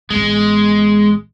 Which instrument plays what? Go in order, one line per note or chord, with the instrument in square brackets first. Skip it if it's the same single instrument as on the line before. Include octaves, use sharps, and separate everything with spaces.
[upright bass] A1 B3 [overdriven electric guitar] G#3